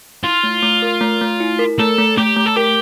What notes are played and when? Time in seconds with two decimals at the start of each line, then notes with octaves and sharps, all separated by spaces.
0.23 E4 F4
0.43 A3
0.63 A3
0.82 A#4
1.01 A3
1.21 A3
1.41 E4
1.59 A#4
1.79 A3 A4
1.98 A3
2.18 A3 G4
2.36 A3
2.46 A4
2.57 G4 A#4